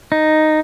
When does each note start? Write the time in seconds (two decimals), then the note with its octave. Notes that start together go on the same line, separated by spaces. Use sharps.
0.12 D#4